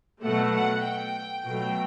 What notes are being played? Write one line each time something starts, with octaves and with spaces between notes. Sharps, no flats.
B2 F#3 A3 F#5
F#5
G5
B2 F#3 A3 G5